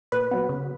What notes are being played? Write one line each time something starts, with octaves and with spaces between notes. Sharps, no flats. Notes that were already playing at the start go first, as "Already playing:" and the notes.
A#2 B4
F#3 B3
C#3